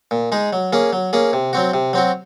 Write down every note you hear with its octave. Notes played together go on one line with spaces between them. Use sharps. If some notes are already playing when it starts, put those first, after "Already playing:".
A#2
G#3 D#4 G#4
F#3
A#3 C#4 G#4
F#3
A#3 C#4 G#4
C3
F#3 C4 F#4
C3
F#3 C4 F#4